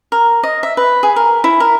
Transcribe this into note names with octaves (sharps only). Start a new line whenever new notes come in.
A#4
D#5
E5
B4
G#4
A#4
E4
A#4